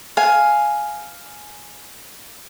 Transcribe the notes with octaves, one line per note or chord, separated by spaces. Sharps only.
F5 G#5